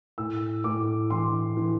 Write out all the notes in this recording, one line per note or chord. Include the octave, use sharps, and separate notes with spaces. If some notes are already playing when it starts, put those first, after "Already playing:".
A2 E6
A2 D6
E3 C6
E3